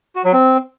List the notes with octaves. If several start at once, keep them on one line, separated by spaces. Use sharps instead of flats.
F#4
F#3
C4